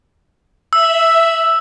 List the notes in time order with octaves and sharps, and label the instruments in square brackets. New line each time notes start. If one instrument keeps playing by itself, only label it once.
[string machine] E5 [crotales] E6